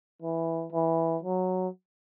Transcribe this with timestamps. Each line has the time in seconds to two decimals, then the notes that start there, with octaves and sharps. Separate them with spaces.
0.22 E3
0.72 E3
1.23 F#3